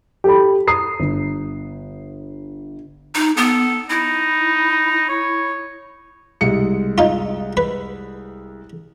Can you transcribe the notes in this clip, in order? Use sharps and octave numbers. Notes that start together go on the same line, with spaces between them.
G4 A4 B5
A#5 D#6 C7
G1
D#4
B3 A4
D#4 E4
C#5
C2 G#3 C#7
D#4 F4
B4